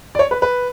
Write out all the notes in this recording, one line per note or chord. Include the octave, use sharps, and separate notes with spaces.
D5
C#5
B4
B4